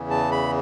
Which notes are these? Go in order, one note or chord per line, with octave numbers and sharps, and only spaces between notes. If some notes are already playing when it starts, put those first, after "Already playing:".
Already playing: E2 C#3 E3
A5
B5